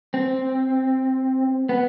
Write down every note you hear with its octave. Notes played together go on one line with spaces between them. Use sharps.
C4
B3